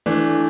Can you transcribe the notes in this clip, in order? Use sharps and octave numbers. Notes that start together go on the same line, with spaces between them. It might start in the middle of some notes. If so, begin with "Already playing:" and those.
E3 A3 D4